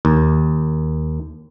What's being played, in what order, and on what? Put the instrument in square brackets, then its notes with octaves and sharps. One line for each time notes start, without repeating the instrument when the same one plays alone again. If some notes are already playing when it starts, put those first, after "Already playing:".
[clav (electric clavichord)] D#2